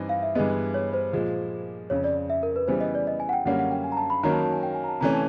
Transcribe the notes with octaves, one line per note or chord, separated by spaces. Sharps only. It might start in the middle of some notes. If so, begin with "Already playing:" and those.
Already playing: G2 E3 C4 D#4
F5
E5
G2 E3 G#3 B3 D#5
C#5
C5
A#2 F3 G#3
F2 C#3 F3 C#5
D5
E5
A#4
B4
C#3 E3 G3 B3 E4 C5
D#5
D5
D#5
G#5
F#5
G5
F#2 D3 G3 A#3 C#4 F#5
F#5
G5
G#5
A#5
A5
B5
D#3 F#3 A#3 C#4 A#5
A5
A5
G#5
G5
G#5
A#5
A5
C3 E3 A3 C#4 A#5
A5